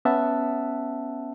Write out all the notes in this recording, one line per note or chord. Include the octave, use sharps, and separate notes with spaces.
B3 C#4 E5 F#5 A5